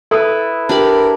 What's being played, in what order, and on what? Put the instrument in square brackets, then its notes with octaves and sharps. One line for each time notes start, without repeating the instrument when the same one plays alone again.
[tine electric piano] E4 B4 [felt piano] A4 D#6
[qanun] D4 G4 B5 [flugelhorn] A#4